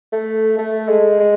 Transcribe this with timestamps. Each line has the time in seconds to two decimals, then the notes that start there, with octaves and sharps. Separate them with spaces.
0.13 A3
0.58 A3
0.88 G#3
1.20 G#3